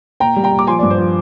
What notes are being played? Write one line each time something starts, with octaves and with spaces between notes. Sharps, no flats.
A#2 G5 A#5
G3
G5 A#5
A#2
D6
F3 G#5 C6
D5
G2
C5
F3